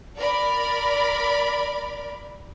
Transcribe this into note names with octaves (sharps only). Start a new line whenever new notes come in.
A#4 D5 B5